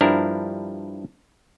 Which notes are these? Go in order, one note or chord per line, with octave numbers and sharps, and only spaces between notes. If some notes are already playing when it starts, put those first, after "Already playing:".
G2 F3 D4 E4 A#4